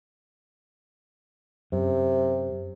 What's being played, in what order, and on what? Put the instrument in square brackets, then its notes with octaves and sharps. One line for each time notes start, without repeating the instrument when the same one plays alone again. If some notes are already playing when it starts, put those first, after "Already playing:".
[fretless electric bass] F#2 [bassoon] C3